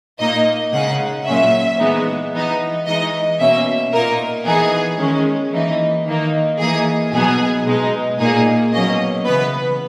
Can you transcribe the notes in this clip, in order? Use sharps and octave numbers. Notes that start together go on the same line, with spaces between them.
A#2 A#3 D#4 D#5
C#3 G#3 D#4 F#5
A#2 F#3 C#4 E5
E3 G#3 B3 D#4
E3 B3 D#4
E3 G#3 D#4 D#5
B2 A#3 C#4 E5
A#2 A#3 D#4 A#4
E3 B3 D#4 G#4
D#3 G#3 C#4
E3 A#3 D#4
D#3 A#3 D#4
E3 A#3 D#4 G#4
B2 F#3 B3 D#4 G#4
B2 G#3 D#4
A#2 A#3 D#4 G#4
B2 F#3 A#3 C#4 D#5
C#3 E3 B3 B4